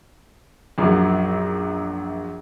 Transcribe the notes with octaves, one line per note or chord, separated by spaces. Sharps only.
A#1 F#2